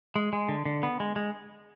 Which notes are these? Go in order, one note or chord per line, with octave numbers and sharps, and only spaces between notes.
G#3
G#3
D3
D3
B3
G#3
G#3